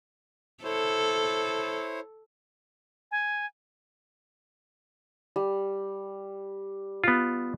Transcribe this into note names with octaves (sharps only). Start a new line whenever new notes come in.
E4 A4 C5 C#5
G#5
G3
B3 F4